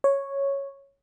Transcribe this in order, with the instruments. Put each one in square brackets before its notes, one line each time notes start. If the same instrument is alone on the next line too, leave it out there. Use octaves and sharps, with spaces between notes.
[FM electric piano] C#5